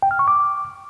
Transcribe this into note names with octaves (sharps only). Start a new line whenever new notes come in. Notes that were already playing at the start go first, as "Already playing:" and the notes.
G5
F6
C#6
D6